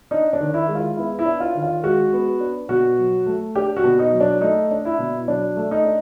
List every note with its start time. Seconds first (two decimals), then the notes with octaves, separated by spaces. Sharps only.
0.11 D4 D#4
0.33 D4
0.40 D#3
0.54 E4
0.68 G#3
0.75 F4
0.97 B3 E4
1.19 E4
1.25 D4
1.40 F4
1.55 D#3
1.62 F4
1.83 G#3 F#4
2.13 B3
2.40 D4
2.69 B2 F#4
2.99 F#3
3.26 A3
3.55 D4 G4
3.76 F#4
3.84 B2
3.99 D#4
4.12 F#3
4.20 D4
4.41 A3 D#4
4.71 D4
4.85 E4
4.98 B2
5.28 F#3 D4
5.56 A3
5.71 D#4
5.85 D4